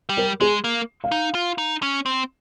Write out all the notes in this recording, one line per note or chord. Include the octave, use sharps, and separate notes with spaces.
G3
A#4
G#3 G#4
A#3
F5
D#4
F4
D#4
C#4
C4